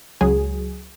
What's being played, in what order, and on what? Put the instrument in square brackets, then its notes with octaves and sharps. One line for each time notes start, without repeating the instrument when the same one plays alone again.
[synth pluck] C#2 F#3 G#4